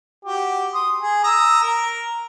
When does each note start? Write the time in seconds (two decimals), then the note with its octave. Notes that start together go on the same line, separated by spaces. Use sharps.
0.25 F#4 G4
0.74 C6 D#6
1.01 G#4
1.24 A#5 D#6 E6
1.63 A#4